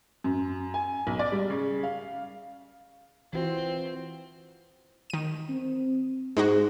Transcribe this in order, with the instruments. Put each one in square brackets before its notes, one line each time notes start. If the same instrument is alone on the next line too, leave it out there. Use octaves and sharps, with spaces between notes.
[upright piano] F#2
G#5
B1
D5
G3
C#3
F5
[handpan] E3 F4 F#4 [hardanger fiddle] C4
[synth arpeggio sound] D#3 D#7
[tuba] C4
[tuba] G#2 [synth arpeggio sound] G#3 D#4 F#4